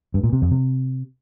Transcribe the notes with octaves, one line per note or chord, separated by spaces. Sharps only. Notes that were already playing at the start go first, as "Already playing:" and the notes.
G2
A#2
C3
F2
C3